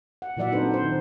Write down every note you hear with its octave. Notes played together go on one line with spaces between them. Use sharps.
F#5
A#2 E3 F#3 D5 E5 F#5
C4 D4 D#4 A4 B4 C5
E4 C5
D#3